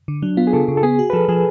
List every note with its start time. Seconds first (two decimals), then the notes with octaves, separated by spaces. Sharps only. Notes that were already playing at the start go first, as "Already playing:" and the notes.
0.08 D3
0.22 F#3 D4
0.37 B3 F4
0.47 G#4
0.53 C#3 A4
0.68 C#3
0.77 A4
0.83 B3 G#4
0.99 F#4
1.10 B4
1.13 F3 A4
1.29 F3 G#4